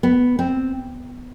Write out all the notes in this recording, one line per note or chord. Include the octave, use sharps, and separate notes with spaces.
B3
C4